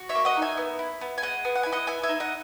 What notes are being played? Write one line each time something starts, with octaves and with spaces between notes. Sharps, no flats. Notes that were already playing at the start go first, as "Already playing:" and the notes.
Already playing: F#4
C#5 E5
A#3
D#5 F#5
D#4
E5 G#5
B3
E4
B3
G#5
G#4 D#5 F#5
B3
F#5
E4 G#5
D#5 F#5
B3 E5 G#5
E5 G#5
D#4
D#5 F#5